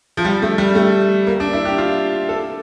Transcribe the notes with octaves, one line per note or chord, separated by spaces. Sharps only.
F3
G3
A3
G3
A3
A#3
D4
E4
G4
F4
A4